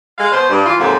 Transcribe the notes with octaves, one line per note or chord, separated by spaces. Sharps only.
G#3 F5
B2 C5
G2
E3 F4
F2 G#2 C3 F#3 A#3